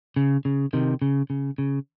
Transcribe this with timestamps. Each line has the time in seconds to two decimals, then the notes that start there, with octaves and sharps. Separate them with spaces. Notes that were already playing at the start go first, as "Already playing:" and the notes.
0.16 C#3
0.45 C#3
0.73 C3 D#3
1.02 C#3
1.30 C#3
1.58 C#3